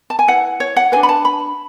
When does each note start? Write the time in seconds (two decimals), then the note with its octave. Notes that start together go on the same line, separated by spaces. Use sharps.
0.10 A5
0.19 G#5
0.28 E4 B4 F#5
0.60 C#5
0.76 F#5
0.92 D4 G#4 B4 G#5
1.03 B5
1.09 A5
1.25 B5